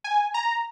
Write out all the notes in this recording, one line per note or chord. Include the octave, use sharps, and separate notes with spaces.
G#5
A#5